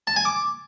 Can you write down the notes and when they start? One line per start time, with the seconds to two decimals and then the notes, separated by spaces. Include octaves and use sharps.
0.07 A5
0.16 G#5
0.25 D6